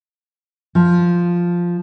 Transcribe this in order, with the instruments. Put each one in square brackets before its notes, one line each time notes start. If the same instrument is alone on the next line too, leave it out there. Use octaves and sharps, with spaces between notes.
[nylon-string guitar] F3